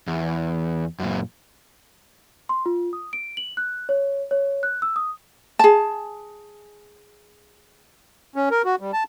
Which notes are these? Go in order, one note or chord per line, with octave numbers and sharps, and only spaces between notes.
E2
F#2 A#2
C6
F4
D#6
D7
F#7
F#6
C#5
C#5
F#6
E6
D#6
G#4 A5
C#4
A#4
F#4
G3
A5